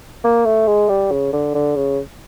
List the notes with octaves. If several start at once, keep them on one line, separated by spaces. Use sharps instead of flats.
A#3
A3
G#3
G3
C#3
D3
D3
C#3